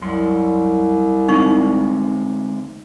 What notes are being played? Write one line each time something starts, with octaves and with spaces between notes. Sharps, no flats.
C2 F#2 C6
D2 G#3 C4 D#4 C#6